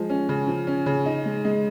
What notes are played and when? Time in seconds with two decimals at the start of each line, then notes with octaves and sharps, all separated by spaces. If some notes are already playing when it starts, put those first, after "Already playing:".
Already playing: F3 G#3
0.10 C#4
0.29 C#3
0.47 F3
0.67 C#4
0.86 C#3
1.06 D#4
1.25 G#3
1.45 G#3